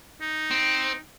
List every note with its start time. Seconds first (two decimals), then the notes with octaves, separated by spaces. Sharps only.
0.21 D#4
0.51 C4